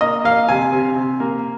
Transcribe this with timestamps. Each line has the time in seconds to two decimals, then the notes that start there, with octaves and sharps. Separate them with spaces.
0.01 A#3 D#5
0.24 A#3 F5
0.48 C3 G#5
0.72 C3
0.96 C3
1.20 A#3